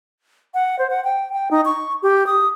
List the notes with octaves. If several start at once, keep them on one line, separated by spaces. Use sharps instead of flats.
F#5
C5
F#5
G5
G5
D#4
C#6
G4
D#6